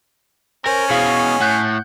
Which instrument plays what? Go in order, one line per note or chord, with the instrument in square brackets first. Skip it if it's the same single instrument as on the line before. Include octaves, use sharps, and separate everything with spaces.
[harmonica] C#4 [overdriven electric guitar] A#4 [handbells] C5
[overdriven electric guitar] B2 E3 [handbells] G#4 F5 C#6
[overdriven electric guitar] A2 [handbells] F#5 F#6 G6